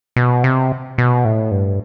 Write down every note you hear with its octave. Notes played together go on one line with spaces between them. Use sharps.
B2
C3
B2
A2
G2